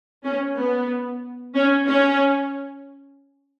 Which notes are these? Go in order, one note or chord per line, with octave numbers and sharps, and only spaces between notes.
C#4
B3
C#4
C#4